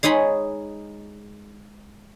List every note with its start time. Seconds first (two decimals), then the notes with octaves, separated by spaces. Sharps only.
0.03 G#3 D#4 G#4 C#5 B5